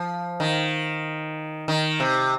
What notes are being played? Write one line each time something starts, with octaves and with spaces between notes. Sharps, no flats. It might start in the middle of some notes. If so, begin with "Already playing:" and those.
Already playing: F3
D#3
D#3
C3